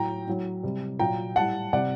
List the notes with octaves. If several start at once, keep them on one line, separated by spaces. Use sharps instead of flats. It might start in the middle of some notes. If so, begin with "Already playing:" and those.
Already playing: A2 F#3 G5 A#5
A2 F#3
C3 G3
A#2 F#3 G5 A#5
A2 G3 F#5 A5
C3 G3 D5 F#5